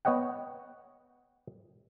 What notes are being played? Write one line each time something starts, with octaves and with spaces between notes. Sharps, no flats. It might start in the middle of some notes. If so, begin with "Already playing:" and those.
B3 C#5 D#5 F#5 G5